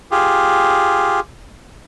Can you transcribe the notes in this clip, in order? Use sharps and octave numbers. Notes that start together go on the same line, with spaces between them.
F4 G4 G#4